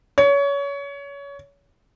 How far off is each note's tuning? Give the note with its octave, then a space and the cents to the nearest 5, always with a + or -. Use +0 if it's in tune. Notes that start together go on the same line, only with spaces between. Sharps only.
C#5 +25